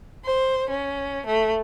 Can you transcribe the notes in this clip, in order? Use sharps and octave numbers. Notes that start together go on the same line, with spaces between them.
C5
C#4
A3